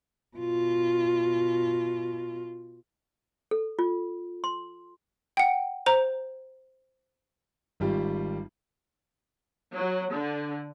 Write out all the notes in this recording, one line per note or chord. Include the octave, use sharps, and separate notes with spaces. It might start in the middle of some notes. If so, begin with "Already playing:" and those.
B2 F4
A4
F4
C6
F#5 G5
C5 A#5
G#1 G3 F4
F#3
D3